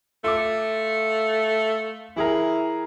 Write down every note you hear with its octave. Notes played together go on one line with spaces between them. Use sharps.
A3 F4 D6
E3 E4 G#4 A#4